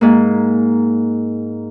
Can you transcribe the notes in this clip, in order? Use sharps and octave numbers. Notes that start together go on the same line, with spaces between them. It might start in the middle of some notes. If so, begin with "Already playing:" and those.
G#2 A#3